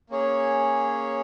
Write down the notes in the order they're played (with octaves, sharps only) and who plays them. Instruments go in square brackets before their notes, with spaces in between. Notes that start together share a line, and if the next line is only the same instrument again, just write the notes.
[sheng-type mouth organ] A#3 C#4 G#4 C#5